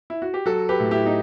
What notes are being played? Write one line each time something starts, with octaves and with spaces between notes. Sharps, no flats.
E4
F#4
G4
F#3 F#4 A4
G4 B4
A2
E4 G4
D#4